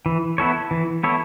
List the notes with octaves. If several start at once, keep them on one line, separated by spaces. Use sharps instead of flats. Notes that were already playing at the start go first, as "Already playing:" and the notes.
E3
B3 E4 A4 C#5
E3
B3 E4 A4 C#5